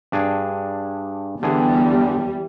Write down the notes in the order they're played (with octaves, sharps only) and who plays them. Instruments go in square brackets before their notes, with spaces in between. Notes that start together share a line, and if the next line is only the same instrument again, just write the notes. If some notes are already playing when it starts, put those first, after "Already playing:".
[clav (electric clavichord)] G2 D4 G#4
[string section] E2 G3 [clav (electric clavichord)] D3 E3 G#4